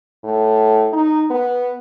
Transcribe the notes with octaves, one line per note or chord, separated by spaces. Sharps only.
A2
D#4
B3